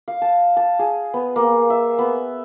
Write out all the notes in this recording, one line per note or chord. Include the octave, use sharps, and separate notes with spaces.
F5
A5
A5
G#4
B3
A#3
E5
B3